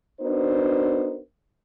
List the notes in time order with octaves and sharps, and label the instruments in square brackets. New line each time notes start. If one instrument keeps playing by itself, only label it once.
[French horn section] B3 D4 D#4 F#4 A#4 C5